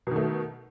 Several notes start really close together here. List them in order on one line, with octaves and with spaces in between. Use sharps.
B2 D#3 A3